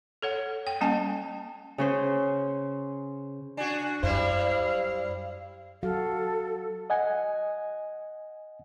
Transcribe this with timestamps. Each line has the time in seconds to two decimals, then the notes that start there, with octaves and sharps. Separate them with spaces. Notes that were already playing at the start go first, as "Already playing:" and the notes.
0.22 A4 C#5 F#5
0.67 G5
0.81 G3 A#3 C#4 G#5 A5
1.78 C#3 C#4 C5
3.57 D4 F#4 G#5
4.03 F#2 G3 E4 C5 F5
5.83 F#3 F#4 A4 F5
6.90 D#5 F#5 G#5